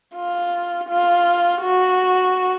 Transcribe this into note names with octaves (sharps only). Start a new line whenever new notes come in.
F4
F4
F#4